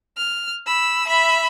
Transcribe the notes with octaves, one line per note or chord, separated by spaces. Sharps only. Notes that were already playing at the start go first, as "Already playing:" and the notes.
F6
B5 E6
E5 B5